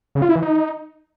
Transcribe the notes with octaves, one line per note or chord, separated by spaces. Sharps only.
C#3
F4
E4
E3
D#4